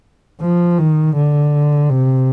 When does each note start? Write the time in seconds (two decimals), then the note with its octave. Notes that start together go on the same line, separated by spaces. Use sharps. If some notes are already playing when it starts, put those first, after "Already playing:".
0.41 F3
0.78 D#3
1.16 D3
1.90 C3